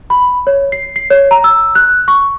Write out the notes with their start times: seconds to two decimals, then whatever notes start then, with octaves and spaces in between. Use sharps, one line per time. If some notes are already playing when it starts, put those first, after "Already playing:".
0.10 B5
0.47 C#5
0.72 C7
0.96 C7
1.10 C#5
1.31 A#5
1.44 E6
1.75 F#6
2.08 C#6